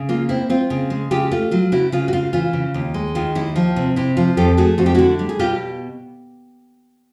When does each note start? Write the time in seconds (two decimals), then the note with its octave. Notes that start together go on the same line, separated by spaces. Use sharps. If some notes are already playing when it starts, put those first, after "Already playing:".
Already playing: C#3
0.09 A#3 F4
0.29 C4 E4
0.50 C4 F4
0.70 C#3
0.90 G#3
1.11 C#3 F4 G4
1.31 A3 F4
1.51 F#3 F4
1.72 C#3 E4 F#4
1.92 C#3 F4
2.08 F#4
2.13 C#3 F4
2.33 E3 F4
2.53 C#3
2.74 D#2
2.94 G#3
3.15 D#3 F4
3.35 D#2 E4
3.56 F3 F4
3.76 C3
3.96 C3 E4
4.17 F3 F4
4.37 F2 G4 A4
4.57 A3 F#4 G#4
4.78 F2 F#4
4.86 G4
4.94 D3 E4 F#4
5.19 G3
5.29 G#4
5.39 B2 F4 G4